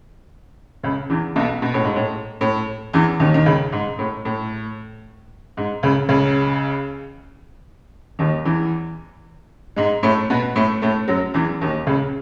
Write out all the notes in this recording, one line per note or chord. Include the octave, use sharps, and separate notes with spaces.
C#2 C#3
E2 E3
B1 B2
B2
A2
G#2
A2
A2
E2 E3
D#2 D#3
D#3
C#2 C#3
G#2
A2
A2
G#2
C#2 C#3
C#2 C#3
D#2 D#3
E2 E3
G#2 G#3
A2 A3
B2 B3
A2 A3
A2 A3
F#2 F#3
E2 E3
D#2 D#3
C#2 C#3